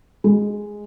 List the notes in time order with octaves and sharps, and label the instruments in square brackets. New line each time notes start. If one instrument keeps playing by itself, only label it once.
[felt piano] G#3